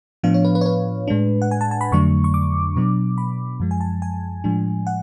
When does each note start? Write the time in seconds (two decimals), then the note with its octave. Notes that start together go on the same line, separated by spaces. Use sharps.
0.23 A2 F3 B3 D4 F5
0.34 C#5
0.45 B4
0.55 B4
0.61 C#5
0.66 B4
1.08 A2 G#3 D4
1.42 F#5
1.51 G#5
1.61 A5
1.71 A5
1.81 B5
1.92 F2 D3 F#3 A3 D4 C#6
2.24 C#6
2.34 D6
2.76 B2 F#3 B3 D4
3.18 B5
3.60 F#2 F3 G#3
3.71 G#5
3.81 A5
4.02 G#5
4.44 A2 F3 G#3 D4
4.87 F#5